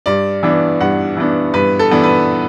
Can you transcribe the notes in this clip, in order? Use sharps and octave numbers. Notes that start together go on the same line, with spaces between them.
G2 D5
E3 B3 D4
G2 F#5
E3 B3 D4
G2 B4
A4
E3 B3 D4
B4